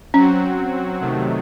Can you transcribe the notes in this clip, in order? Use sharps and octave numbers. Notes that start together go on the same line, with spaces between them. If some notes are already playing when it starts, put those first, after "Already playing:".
F#3 C4 C#4 F#4
C3 D#3 F#3 A3